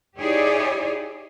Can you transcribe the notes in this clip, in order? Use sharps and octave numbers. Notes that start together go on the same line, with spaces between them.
D#4 E4 G4 G#4 C#5 D5